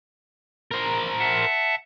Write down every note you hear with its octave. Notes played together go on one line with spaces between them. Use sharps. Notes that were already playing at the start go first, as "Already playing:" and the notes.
A#4 C5
E5 F#5 A5